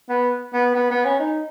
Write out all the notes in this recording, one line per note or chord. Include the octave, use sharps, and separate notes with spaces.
B3
B3
B3
B3
C#4
D#4